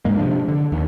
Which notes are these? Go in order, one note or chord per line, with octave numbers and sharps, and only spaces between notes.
G2 G#3 A#3
C3 F3 D4
D3
D#2